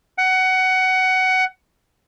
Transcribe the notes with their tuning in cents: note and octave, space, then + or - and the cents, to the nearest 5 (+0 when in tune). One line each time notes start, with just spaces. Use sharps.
F#5 +20